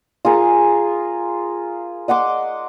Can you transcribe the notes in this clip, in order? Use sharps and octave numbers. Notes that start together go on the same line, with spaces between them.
F4 G#4 A#4
D#5 F#5 C6 D6